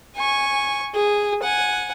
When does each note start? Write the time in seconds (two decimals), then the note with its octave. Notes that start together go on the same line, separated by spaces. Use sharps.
0.16 G#5 C#6
0.95 G#4
1.43 F#5 G#5